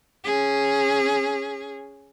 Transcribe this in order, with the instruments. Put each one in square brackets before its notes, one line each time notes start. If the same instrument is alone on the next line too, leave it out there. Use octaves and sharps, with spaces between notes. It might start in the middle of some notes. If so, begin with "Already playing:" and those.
[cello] C#4 G#4